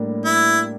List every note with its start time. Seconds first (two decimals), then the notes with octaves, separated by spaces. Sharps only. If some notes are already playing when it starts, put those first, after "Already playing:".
Already playing: A2 G3 A#3 D4
0.25 E4